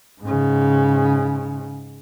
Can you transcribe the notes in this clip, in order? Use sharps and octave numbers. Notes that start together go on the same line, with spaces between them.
G#2 C#3